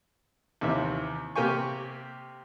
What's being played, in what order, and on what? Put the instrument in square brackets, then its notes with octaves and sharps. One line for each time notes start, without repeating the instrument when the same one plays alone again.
[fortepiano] D#2 C3 E3 E5
C3 A#3 G4 G5 G#5 C#6